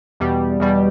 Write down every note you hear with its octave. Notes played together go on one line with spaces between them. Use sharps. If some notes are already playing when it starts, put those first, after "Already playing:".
E2 B2 G3
E2 B2 G3